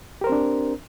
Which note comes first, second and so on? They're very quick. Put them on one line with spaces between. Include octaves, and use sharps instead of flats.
G4 A#4 C5 C4 D4